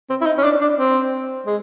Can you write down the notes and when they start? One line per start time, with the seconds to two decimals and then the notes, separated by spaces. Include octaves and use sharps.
0.10 C4
0.21 E4
0.26 D#4
0.38 C#4
0.44 D4
0.61 D4
0.78 C4
1.47 G#3